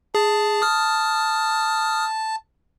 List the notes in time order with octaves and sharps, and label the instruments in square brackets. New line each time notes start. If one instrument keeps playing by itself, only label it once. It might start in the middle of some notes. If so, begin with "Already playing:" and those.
[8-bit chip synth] G#4 [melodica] A5
[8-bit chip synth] D#6 F6